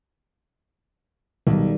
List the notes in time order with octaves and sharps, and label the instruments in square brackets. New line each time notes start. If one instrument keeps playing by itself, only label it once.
[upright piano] B1 [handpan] D#3 G3